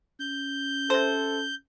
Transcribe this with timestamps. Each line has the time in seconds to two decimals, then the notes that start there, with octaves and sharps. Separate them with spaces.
0.20 C#4 G6
0.90 C3 A4 C5